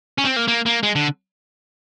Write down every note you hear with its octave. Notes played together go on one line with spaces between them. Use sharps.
C#4
C4
A#3
A#3
A#3
G#3
D3